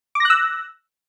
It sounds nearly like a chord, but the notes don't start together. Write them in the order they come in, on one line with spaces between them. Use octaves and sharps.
D6 A#6 F#6 E6